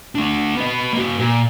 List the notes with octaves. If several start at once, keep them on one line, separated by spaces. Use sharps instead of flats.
A3 D4
B3 D#5
A#3 F#4
A#2